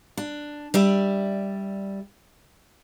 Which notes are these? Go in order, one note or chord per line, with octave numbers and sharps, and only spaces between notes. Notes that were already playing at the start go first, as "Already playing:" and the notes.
D4
G3 D5 E5